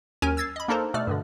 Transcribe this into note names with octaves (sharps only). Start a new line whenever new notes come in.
D#2 F#3 C#4 A#4 G#5 D#7
E6 G#6 A6 C7
D#5 B5
A#3 D4 D#4 A4 A#4 C5
B2 A3 D5 F6
G2 B2 D3